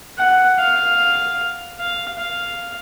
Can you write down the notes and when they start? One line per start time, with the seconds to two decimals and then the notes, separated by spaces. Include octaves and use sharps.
0.19 F#5
0.59 F5
1.79 F5
2.19 F5